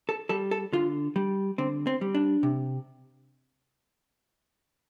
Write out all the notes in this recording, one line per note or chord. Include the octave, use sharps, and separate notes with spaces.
A4
G3 A4
A4
D3 F4
G3
D3 C4
C4
G3
D4
C3